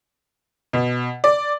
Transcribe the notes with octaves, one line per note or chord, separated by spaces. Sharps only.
B2
D5